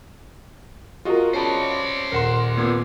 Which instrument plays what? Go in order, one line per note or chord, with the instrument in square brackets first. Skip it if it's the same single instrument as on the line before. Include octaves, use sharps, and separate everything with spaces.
[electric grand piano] F4 F#4 D#5 [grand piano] G#4 A#4
[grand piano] C#4 A5 B5 [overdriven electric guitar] C5 D5
[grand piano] D#1 E7 [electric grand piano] A#4 F#5 C6
[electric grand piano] A#2 B3 G#6